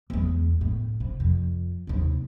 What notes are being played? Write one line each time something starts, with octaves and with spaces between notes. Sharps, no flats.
E2 G#3
A2
C3
F2
D#2 C3